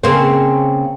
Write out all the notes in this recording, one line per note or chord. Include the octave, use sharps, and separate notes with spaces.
C#3 A#3 C4